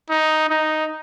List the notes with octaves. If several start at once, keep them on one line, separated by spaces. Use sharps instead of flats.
D#4
D#4